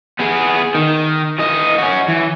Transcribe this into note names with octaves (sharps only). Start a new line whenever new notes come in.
B3 G#4
D#3
E3 D#5
C#4 F#4
E3